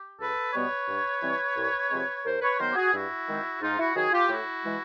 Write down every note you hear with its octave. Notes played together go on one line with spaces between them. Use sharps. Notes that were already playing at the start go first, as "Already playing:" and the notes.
Already playing: G4
C#2 A4 B4
B2 G3 B3 B4 C#5
G2
E3 G3 C4
C2
C3 F3 G#3 C4
D#2 A#4 C5
B4 C#5
D#3 F#3 B3 A#4 C5
G4
F#4 G#4
G2 E4 F#4
D#3 G#3 C4
G#2 D#4 F4
E4 F#4
D#3 F#3 F#4 G#4
F4 G4
A2 E4 F#4
E3 G#3